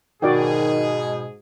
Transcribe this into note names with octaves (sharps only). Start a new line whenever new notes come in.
G#2 B2 D#3 F#4 G#4 D5 G5